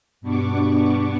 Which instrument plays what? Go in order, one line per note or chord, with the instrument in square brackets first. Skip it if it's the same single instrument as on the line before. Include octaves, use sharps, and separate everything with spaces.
[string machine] G2 B2 B3 D4 C#6 D6